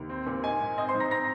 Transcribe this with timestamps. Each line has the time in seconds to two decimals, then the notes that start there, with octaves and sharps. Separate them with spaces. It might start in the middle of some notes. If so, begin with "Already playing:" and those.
Already playing: D#2
0.10 C4
0.27 A#2
0.44 D#4 G#5
0.60 G#2
0.77 C4 D#5 D#6
0.89 C5 C6
0.95 G#2
1.00 A#5 A#6
1.11 C4 A#5 A#6